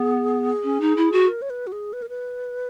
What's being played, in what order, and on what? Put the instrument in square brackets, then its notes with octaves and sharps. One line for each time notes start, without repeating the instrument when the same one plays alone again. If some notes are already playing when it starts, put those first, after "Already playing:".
Already playing: [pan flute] B3 [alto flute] G#4
[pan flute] C#4
D#4
E4
F#4
[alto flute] A#4
C#5
B4
F#4
G#4
B4
A#4
B4